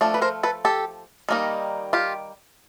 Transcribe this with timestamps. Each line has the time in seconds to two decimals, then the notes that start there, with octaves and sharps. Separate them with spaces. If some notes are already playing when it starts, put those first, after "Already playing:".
0.01 F3 A3 D4
0.14 B4
0.22 A#4 C5
0.43 A4 B4
0.65 G4 A4
1.29 D#3 G3 A#3 D#4
1.93 F4 G4